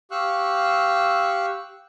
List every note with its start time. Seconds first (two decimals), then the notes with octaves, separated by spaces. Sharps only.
0.11 G4 F5 C#6 E6 F#6